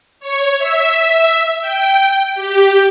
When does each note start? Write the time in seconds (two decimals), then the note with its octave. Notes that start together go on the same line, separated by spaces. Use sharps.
0.20 C#5
0.58 E5
1.61 G5
2.35 G4